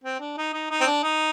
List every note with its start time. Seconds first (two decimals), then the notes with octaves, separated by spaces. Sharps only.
0.04 C4
0.20 D4
0.38 D#4
0.53 D#4
0.71 D#4
0.81 C4
0.86 D4
1.04 D#4